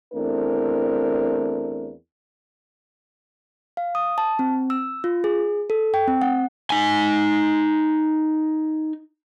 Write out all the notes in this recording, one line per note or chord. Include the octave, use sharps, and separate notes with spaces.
E2 A3 C4 D4 E4 A#4
F5
D#6
A5
C4
E6
F4
G#4
A4
G5
C4
F#5
D#4 G#5